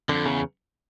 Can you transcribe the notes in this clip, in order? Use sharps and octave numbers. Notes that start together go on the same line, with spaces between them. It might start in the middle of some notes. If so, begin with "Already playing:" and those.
F2 D3
E2 C#3